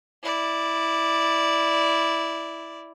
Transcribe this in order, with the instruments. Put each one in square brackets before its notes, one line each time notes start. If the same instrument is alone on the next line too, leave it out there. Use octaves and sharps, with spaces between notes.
[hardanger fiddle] E4 D5